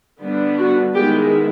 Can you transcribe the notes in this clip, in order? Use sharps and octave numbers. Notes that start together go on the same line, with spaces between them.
D3 G3 B3 D4
F#4
D#3 G#3 B3 E4 G4